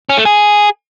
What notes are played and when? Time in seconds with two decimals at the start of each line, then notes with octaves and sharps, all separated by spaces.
0.09 C#4
0.17 A3
0.25 G#4